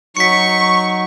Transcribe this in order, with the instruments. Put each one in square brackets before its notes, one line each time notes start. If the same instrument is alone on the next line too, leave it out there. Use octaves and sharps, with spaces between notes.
[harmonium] F#3 D#4 [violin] C#6 [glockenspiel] B6 C#7